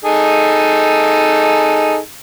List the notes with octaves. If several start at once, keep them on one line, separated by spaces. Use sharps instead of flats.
D#4 G#4 A4